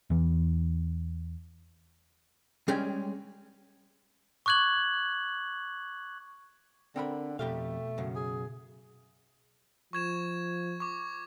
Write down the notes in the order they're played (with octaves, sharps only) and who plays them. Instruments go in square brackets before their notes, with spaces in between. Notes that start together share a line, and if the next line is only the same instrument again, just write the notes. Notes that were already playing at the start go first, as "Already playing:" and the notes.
[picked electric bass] E2 E3
[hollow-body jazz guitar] G3 G#3 C#4 G#4 G5
[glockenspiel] C#6 D6 F#6 G#6 F#7
[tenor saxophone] D3 [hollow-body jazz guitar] C4 A#4 B5
[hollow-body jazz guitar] F2 G4 F5 [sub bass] B2 [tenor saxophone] A3
[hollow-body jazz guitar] F#2 C#3
[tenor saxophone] G#4
[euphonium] F3 [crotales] C#6 G#6 E7
[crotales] C#6 D6